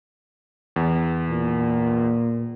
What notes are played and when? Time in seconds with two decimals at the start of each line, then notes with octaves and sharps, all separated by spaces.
0.76 E2
1.30 A#2